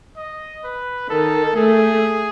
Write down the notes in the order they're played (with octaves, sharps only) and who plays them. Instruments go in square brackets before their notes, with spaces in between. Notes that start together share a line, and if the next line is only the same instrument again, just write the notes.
[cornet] D#5
B4
[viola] D#3 [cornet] A4
[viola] A3 [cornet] G#4